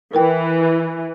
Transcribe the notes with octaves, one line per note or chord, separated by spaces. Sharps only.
E3 A#4 B4 G5